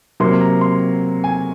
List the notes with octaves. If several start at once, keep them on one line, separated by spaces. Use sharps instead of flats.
C3 F#3 A#3 C6
A#5
C6
G#5